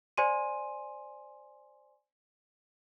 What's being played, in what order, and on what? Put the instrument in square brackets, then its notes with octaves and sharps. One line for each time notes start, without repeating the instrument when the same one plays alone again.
[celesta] C5 D5 G#5 C6 D#7